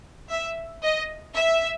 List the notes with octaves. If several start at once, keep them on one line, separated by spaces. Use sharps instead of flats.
E5
D#5
E5